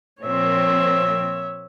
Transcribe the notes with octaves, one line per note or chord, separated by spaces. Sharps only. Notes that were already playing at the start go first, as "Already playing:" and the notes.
A#2 F3 C4 C#5 E5